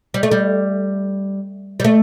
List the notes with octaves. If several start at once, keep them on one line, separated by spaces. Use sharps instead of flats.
G3
A3
G3
G3
A3